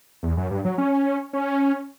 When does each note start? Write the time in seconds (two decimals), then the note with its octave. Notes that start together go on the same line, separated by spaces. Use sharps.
0.23 E2
0.37 F#2
0.51 G2
0.65 F#3
0.78 C#4
1.33 C#4